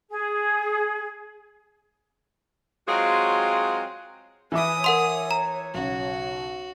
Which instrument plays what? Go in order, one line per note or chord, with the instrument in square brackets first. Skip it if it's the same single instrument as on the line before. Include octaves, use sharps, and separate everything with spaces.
[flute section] G#4
[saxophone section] F#3 G#3 C4 F4 F#4 G#4
[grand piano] E3 E5 D6 [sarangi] B4 [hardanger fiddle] G#5 D#6
[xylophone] A#4 F#5 C6 [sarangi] C#5
[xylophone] A#5
[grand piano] B1 C#3 [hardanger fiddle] F#4